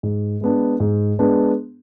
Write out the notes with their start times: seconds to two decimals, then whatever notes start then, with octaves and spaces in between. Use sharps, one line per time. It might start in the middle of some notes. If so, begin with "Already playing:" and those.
0.03 G#2
0.41 G#3 B3 D4
0.80 G#2
1.19 G#3 B3 D4